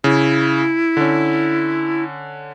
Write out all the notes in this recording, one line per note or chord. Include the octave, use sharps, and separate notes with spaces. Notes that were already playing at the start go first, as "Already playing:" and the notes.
C#3 E4
D3 C#4